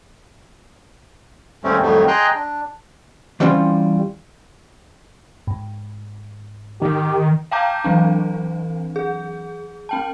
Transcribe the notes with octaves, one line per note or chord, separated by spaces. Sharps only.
D#2 G#2 G3 A3 C4 C#4
F2 A2 D#3 F#3 G3 A3
G#4 D#5 G5 A#5 C6 F#6
D4
E3 G3 C4 C#4 F4
G#2
D#3 G4
F5 G5 A5 A#5 D6 G6
E3 F#3 C4 D4
G#4
C4 G5 A5